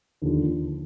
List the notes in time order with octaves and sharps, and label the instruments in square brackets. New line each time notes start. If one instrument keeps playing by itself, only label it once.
[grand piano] D#2 D3 F3